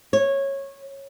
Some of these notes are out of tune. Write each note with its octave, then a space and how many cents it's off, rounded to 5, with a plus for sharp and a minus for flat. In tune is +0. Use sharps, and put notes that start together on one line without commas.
C#5 -15